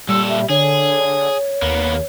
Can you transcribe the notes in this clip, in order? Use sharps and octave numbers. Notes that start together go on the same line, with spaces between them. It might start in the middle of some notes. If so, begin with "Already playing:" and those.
A#2 G3 A4 E6
E5
D3 G#4 C#5
D#2 A#3 B3